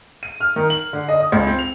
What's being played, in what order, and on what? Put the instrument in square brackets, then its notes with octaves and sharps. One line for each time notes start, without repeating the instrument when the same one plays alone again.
[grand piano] D#7
F6
D#3
F#7
D3
D#5
D#6
C#2
C4
F7